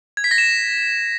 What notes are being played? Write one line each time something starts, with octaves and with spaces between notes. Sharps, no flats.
G#6
B6
A#6
E7